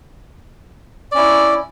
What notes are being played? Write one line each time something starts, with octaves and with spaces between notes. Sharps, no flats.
C#4 E4 D5